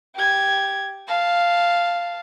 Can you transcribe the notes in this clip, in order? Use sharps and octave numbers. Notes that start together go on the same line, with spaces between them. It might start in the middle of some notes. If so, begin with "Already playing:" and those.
G4 G#6
F5 A5